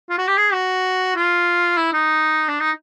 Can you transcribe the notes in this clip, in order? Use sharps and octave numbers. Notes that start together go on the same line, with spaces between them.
F4
F#4
G4
G#4
F#4
F4
E4
D#4
D4
D#4